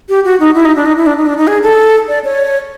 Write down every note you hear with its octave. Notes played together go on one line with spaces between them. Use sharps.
G4
F#4
D#4
E4
D#4
D4
D#4
E4
D4
D#4
D4
D#4
G#4
A4
D5
C#5